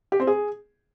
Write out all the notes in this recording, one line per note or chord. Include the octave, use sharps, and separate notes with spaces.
G4
C4
G#4